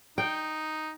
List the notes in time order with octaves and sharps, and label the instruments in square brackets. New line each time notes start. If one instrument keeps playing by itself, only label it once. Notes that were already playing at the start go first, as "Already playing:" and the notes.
[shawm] D#4 [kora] G5